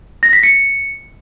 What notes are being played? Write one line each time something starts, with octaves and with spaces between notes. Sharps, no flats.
A#6
B6
C#7